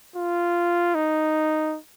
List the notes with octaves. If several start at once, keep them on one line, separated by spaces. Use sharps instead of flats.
F4
D#4